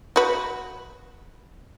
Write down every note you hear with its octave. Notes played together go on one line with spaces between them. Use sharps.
F#4 B4